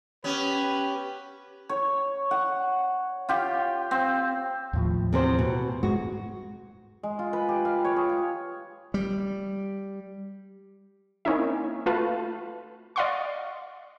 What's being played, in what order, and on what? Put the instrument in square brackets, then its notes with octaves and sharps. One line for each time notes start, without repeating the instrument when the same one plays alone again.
[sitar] B3 C#4 [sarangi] G4 [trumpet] B4
[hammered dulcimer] C#5
F#5
F4 G4
C4
[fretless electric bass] D#2 A2 F3
[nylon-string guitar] E2 C3 C5
B2
[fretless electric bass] G#2 G#3 [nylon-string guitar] F#4
[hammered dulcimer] G#3
F4
B4
G4
F5
C#5
G#4
F4
[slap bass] G3
[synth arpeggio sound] A#3 C4 C#4 D#4 E4 E5
A3 F4 F#4 B4 F5 A5
D5 D#5 F5 F#5 C6 C#6